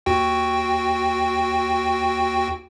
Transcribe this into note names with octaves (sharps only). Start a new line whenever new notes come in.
D#2 F#4 G5